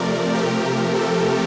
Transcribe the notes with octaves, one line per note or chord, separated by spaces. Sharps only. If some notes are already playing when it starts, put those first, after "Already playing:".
Already playing: C3 F3 A3 A#4 D5
C3 F3 A3 G4 A#4
A4